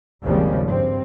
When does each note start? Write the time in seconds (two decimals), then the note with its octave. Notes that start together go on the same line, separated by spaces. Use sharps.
0.24 G#1 D#2 C#3 F3 G3
0.68 G2 C4